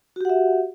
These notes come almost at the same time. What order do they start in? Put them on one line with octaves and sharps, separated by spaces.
F#4 G4 F#5 E5